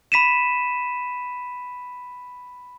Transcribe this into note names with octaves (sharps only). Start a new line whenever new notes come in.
B5 B6 D#7 E7